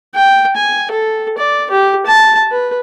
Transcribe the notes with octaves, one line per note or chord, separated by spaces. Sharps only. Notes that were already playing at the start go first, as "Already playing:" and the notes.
G5
G#5
A4
D5
G4
A5
B4